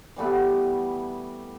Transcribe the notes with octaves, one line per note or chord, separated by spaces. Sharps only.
E3 G3 A3 B3